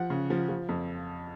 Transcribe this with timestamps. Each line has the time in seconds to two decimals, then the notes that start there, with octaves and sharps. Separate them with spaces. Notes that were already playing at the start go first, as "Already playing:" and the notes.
Already playing: F3 F#5
0.10 C#3
0.30 F3
0.49 F3
0.69 F2